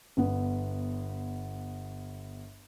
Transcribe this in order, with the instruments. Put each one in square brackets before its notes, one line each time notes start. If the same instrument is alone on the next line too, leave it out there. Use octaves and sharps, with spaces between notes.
[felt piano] G1 B3